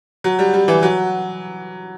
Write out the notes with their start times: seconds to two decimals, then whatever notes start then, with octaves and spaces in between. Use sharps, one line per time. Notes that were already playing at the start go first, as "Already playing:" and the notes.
0.24 F#3
0.39 G3
0.53 G3
0.68 E3
0.83 F#3